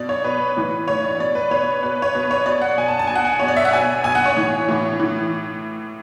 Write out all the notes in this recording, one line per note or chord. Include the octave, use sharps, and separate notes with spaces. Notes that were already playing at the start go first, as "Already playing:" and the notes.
Already playing: B2 D5
C#5
B2 B4
A2 E3
A2 E3 C#5
D5
B2 D5
B4
B2 C#5
B2 B4
C#5
B2 B4
C#5
B2 D5
F#5
B2 G#5
A5
A5
B2 G#5
F#5
G#5
B2 C#5
D5
E5
F#5
B2 G#5
B2 G#5
F#5
C#5
A2 E3
A2 E3
A2 E3